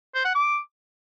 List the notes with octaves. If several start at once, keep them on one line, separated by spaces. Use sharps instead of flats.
C5
F#5
D6